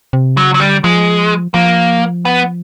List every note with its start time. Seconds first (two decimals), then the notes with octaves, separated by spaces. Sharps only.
0.13 C3
0.36 C#3 F#3
0.54 F#3
0.60 D3 G3
0.84 F3 G#3
1.54 F3 A#3
2.25 B3